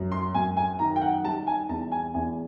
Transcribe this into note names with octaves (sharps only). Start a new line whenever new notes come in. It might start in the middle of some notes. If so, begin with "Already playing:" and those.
Already playing: F#2
C6
F#2 G#5
G#5
D#3 A#5
G5
F#5
G3 A5
G#5
E2 A5
G#5
E2 G#5